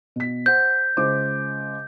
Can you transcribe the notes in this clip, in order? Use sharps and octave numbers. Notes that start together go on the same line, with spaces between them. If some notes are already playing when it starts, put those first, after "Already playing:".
B2 B6
C5 F#5 G6
C#2 C5 D6